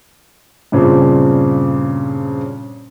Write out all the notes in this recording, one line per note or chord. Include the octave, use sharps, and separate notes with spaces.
G2 A#2 C#3 C4 D4